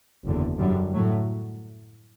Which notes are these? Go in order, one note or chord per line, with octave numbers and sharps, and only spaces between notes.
F#1 E2 D3
F#2 D3 G3
A2 F#3 A3